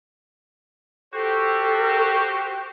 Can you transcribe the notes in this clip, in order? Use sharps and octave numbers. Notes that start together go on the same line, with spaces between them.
F#4 G4 A4 C5